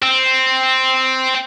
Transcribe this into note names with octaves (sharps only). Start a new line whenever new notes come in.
C4